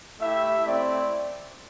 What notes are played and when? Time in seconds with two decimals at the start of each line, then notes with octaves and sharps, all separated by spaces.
0.20 A3 E4 G4 E5
0.66 A3 C4 E4 D5